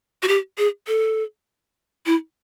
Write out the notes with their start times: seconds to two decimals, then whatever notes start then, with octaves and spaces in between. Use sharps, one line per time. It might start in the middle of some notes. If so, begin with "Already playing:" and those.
0.23 F#4
0.28 G4
0.58 G#4
0.88 A4
2.06 E4